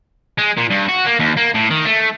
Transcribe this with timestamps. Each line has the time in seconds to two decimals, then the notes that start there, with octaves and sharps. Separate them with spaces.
0.38 G#3
0.58 A#2
0.71 G2
0.89 F#4
1.06 A#3
1.19 D#2
1.37 A#3
1.54 A2
1.71 D#3
1.85 A3